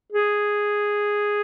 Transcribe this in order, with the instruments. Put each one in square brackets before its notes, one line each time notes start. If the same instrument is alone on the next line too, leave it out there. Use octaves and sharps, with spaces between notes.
[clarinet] G#4